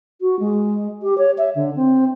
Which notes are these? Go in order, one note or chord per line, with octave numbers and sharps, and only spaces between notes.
F#4
G#3
G4
C#5
E5
D3
C4